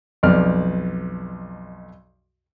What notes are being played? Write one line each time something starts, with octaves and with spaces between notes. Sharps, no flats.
B1 F2 D5 F6